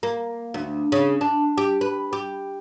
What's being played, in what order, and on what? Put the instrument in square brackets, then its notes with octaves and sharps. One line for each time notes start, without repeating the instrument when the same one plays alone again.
[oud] A#3
D2
C#3
D4
G4
B4
G4